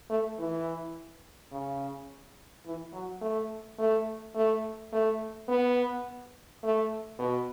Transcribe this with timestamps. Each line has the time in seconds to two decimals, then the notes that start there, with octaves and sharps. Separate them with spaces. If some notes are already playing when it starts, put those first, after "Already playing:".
0.10 A3
0.39 E3
1.52 C#3
2.66 E3
2.93 F#3
3.21 A3
3.79 A3
4.35 A3
4.93 A3
5.48 B3
6.63 A3
7.19 B2